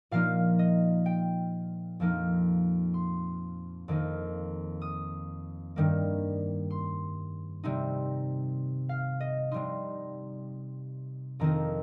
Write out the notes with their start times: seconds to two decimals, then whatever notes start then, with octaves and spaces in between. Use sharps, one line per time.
0.11 A#2 F3 A#3 D#4 F5
0.59 D#5
1.06 G5
2.00 F2 F3 A#3 D#4
2.94 C6
3.88 F2 D#3 A#3 D#4
4.82 D#6
5.76 G2 D#3 G3 A#3
6.70 C6
7.64 C3 G3 C4 D#4
8.89 F5
9.20 D#5
9.51 C3 G3 D#4 C6
11.40 F2 D#3 C4 D#4 A#5